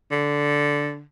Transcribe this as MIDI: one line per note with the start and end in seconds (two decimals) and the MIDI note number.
0.11 1.02 50